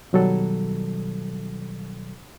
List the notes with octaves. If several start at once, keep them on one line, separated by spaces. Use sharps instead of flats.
B2 D#3 F#3 G3 A4